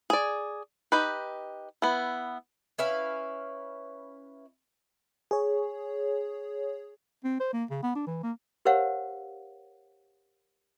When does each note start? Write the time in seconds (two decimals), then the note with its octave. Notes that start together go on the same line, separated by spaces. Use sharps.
0.10 G#4 D5
0.92 D#4 G4 B4
1.82 B3 E4
2.78 C#4 E4 B4 F5
5.31 G#4 C#5
7.24 C4
7.40 C5
7.53 A#3
7.70 C#3
7.83 B3
7.95 D4
8.07 E3
8.23 A#3
8.65 G4 A#4 C5 C#5 F5 F#5